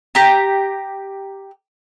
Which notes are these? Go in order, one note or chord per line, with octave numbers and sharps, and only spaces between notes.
G4 A#5